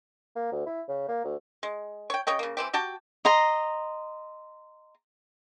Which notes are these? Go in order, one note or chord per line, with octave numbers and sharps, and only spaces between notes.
A#3
D2
E4
C#3
A#3
D2
G#3
C#5 G5
C#3 C#5 D#5 G5
C#3 A#3
E3 C4 G4
F#4 G4 G5 A5
D#5 A#5 C6